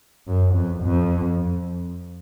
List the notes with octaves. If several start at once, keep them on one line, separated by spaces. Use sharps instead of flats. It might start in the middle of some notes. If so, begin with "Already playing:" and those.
F#2
F2
F2